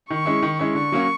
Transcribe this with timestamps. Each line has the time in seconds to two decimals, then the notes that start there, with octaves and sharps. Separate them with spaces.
0.10 D#3 C#6
0.26 G#3 C#4 E4
0.42 D#3
0.59 G#3 C#4 E4
0.75 D3 C#6
0.92 F#3 A#3 C#4